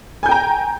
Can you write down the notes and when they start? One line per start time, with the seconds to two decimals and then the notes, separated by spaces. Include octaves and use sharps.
0.23 G#5
0.26 G6
0.29 G5
0.31 A#5